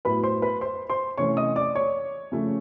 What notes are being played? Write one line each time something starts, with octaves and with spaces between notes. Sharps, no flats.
A2 F#3 B3 B4 B5
C5 C6
B4 B5
C5 C6
C5 C6
C3 E3 A3 C#4 C#5 C#6
D#5 D#6
D5 D6
C#5 C#6
C#3 F3 A3